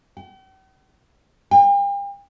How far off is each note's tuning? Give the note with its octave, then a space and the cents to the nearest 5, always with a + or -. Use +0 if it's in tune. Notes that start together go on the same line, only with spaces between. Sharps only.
G5 -45
G5 +40